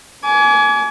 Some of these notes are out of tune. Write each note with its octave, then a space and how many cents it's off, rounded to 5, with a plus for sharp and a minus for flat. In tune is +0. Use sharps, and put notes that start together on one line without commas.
G#5 +25 D6 -30